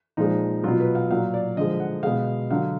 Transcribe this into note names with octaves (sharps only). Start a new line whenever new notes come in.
A#2 F3 G#3 D#4
B2 F#3 F4
B4
F5
A#2 F#3 F5
D5
D3 F3 G#3 D#5
F#5
B2 G#3 F5
D3 F#3 F5